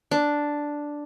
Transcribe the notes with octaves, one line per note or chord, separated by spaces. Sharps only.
D4